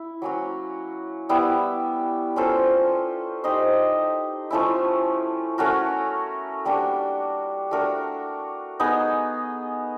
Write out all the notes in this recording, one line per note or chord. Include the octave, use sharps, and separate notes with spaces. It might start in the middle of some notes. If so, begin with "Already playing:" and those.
Already playing: E4
F#3 A#3 C#4 F#4
G3 B3 E4
C#4 F4 A4 C5
D#4 G4 C5 D#5
F3 A3 C#4 E4
A3 C#4 F#4 A#4
G3 A#3 D4 F#4
A3 D4 F#4 A#4
B3 D#4 G#4